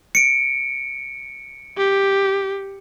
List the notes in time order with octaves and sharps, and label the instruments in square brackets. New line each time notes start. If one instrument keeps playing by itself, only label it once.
[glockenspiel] C#7 D7
[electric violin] G4